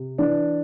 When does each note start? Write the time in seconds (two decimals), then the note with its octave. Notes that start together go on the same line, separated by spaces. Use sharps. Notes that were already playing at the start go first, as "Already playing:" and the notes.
Already playing: C3
0.18 E3 D4